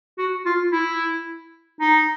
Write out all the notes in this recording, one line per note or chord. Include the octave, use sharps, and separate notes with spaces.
F#4
F4
E4
D#4